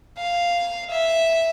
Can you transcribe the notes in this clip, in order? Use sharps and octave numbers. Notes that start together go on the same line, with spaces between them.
F5
E5